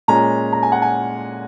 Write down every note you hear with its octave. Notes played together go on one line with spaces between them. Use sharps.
A#2 G#3 C#4 A#5
A#5
G#5
F#5
G#5